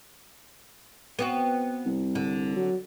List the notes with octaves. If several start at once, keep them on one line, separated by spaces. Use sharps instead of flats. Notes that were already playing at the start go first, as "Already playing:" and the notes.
B3 C4 F#4
C2
D3
F#3